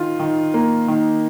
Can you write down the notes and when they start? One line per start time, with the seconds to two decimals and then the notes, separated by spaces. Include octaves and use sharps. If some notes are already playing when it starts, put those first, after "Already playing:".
Already playing: D#3 F4
0.20 D#3
0.54 A#3
0.88 D#3